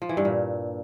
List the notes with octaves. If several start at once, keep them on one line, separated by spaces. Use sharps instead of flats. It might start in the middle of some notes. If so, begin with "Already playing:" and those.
F3
E3
G2
A#2